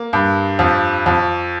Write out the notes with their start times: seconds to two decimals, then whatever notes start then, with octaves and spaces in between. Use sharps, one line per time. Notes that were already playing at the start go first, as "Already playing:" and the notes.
Already playing: A#3
0.13 G2
0.59 F2
1.06 F2